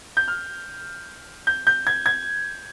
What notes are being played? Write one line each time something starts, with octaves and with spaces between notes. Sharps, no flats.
G6
F6
G6
G6
G#6
G#6